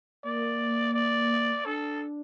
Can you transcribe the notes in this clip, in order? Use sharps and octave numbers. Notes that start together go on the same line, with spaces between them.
A#3 D5
D5
D4 A4